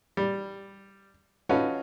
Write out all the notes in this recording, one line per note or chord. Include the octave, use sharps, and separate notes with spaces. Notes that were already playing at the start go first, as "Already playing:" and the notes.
G3
C#4 D#4 F4 F#4 A4 B4